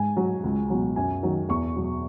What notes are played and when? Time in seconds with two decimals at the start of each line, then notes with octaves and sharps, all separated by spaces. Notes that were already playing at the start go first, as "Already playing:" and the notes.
Already playing: G#2 G#5
0.17 F#3
0.44 C#2
0.70 B2 F#3
0.96 F#2 G#5
1.22 D#3 F#3
1.49 E2 C#6
1.76 B2 F#3